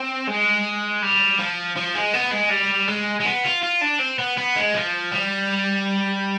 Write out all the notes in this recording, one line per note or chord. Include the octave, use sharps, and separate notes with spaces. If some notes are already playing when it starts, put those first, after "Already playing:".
Already playing: C4
G#3
G3
F3
F3
G#3
B3
G#3
G3
G#3
G#3
B3
F4
F4
D4
C4
B3
B3
G#3
F3
G3